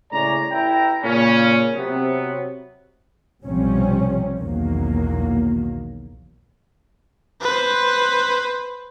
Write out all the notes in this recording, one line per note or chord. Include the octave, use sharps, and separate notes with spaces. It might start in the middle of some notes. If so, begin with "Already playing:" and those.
A2 C#3 G#3 C#5 D5 A#5
A1 E4 G5 A#5
A#2 C#3 C#4
C3 F#3 B3
B1 C3 F3 G3 C4 C#4
B1 E2 D#3 F#3 A#3
B4 C5